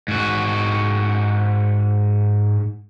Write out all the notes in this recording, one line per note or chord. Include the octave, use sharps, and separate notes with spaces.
G#2 F#4